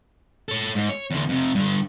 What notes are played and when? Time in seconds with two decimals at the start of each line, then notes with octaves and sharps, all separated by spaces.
0.49 A4 C#5
0.75 G#2
0.89 C#5
1.11 E2 D3
1.29 F2 C3
1.55 G2 D3